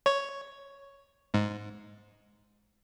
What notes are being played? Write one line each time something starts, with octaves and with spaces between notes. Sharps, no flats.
C#5
G#2